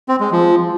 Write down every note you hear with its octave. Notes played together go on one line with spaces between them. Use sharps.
C4
G#3
F3